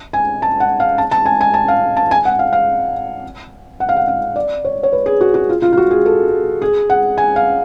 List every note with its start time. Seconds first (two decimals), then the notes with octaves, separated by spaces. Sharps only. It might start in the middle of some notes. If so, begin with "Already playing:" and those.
0.13 G#5
0.42 A5
0.60 F#5
0.80 F5
0.98 A5
1.11 A5
1.26 G#5
1.41 G#5
1.54 A5
1.68 F5
1.97 A5
2.11 G#5
2.25 F#5
2.39 F5
2.53 F5
3.80 F#5
3.89 F5
3.97 F#5
4.08 F5
4.36 D5
4.65 C#5
4.83 C#5
4.92 B4
5.06 G#4
5.21 F#4
5.34 F#4
5.49 F4
5.62 F4
5.73 F4
5.77 F#4
5.91 G#4
6.06 A4
6.62 G#4
6.90 F#5
7.18 G#5
7.36 F5